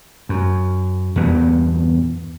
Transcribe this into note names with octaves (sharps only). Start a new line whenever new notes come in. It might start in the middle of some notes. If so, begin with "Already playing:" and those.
F#2
E2 G2 A#2 B3